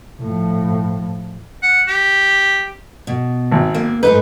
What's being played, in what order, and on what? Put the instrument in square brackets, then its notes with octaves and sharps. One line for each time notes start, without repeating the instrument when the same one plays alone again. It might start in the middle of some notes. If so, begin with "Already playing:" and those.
[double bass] A2 F3
[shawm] F#5
G4
[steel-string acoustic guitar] B2
[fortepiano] G#1
[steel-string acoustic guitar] A#3
[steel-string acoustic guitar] G#2 A3 D#4 [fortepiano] B4